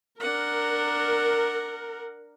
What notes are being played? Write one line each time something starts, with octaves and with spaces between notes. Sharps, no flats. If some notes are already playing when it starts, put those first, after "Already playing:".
D4 A#4 F#5